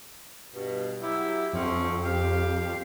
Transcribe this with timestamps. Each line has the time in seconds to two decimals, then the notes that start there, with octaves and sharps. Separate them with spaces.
0.54 G2 B2
1.01 F#3 E4 G4
1.53 F2 D3 C4 C#4
2.04 G4 F5